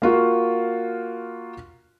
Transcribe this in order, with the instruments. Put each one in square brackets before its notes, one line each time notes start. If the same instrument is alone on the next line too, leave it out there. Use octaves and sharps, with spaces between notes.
[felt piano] A#3 F4 F#4